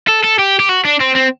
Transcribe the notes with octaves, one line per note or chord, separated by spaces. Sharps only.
A4
A4
G4
G4
F#4
D4
C4
C4